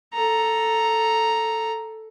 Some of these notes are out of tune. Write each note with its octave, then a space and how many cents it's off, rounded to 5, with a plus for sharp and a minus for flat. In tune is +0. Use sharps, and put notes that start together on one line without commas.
A4 +0 A#5 +0